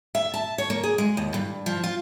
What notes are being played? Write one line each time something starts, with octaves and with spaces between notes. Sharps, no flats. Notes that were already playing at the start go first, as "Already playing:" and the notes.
E5
A5
C#5
A#3
G#4
G#3
D#2
G2
F3
F4